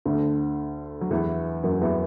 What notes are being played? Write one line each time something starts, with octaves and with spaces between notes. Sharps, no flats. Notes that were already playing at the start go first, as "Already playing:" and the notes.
D2 D3
F#3
E2 E3
F#2 F#3
E2 E3